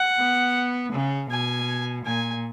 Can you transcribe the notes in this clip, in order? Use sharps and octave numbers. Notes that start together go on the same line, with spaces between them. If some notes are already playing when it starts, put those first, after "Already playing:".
Already playing: F#5
B3
C#3
B2 G#5
A#2 G#5